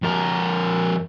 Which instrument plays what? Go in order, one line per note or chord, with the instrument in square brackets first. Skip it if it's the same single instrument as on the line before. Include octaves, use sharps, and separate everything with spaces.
[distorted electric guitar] F2 A#4